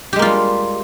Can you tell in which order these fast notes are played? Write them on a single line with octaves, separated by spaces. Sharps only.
G4 G#3 A#3 F4 G3